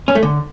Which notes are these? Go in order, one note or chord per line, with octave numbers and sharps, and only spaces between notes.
C#4
A3
D3